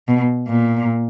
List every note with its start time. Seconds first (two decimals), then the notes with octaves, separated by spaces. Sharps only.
0.08 B2
0.48 A#2